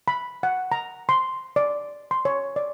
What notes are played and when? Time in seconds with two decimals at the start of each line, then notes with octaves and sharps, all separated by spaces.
0.08 B5
0.43 F#5
0.72 A#5
1.09 C6
1.56 D5
2.11 C6
2.25 C#5
2.56 D5